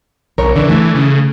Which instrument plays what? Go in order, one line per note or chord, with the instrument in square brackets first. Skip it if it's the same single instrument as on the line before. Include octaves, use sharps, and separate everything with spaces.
[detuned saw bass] B1 [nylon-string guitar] A#4 C#5
[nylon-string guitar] D3 [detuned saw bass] E3
[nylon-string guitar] A3
[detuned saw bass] C#3